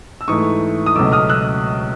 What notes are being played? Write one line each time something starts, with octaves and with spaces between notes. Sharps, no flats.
E6
G#2 E3 A3 C#6 D#6
D#6
C#2 B2 F#3 A3 D6 E6
D#6 F6
E6 F#6